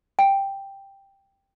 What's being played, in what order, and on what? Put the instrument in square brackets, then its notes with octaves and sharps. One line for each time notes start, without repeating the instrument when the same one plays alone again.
[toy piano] G5